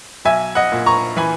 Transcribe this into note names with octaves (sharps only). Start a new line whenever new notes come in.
B1 E5 G#5
D#5 F#5
A#2
A#5 C#6
E3 G#5 B5